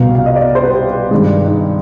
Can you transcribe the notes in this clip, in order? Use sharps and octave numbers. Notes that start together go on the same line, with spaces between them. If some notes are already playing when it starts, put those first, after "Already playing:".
Already playing: C2 B2 B3 F5
F5
D#5
D5
C5
B4
G4
G2 D#3 G#3
D#4